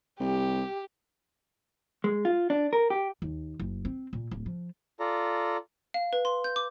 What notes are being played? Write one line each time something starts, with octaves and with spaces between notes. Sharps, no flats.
C2 G4
G#3
F4
D4
A#4
G4
D#2
F#1
C4
A#2
D1
F3
F4 A4 D5 A#5
F5
B4
C6
G6
D6